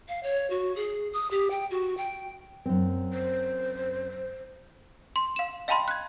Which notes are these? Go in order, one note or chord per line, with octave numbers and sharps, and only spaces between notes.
F5
C#5
F#4
G#4
D#6
G4
G5
F#4
G5
F#2 C4
C5
C6
F5 E7
D#5 F5 G5 A5 B5 C6
F#6 G#6